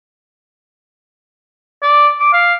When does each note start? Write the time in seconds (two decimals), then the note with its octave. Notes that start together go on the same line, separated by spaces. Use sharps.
1.83 D5
2.20 D6
2.33 F5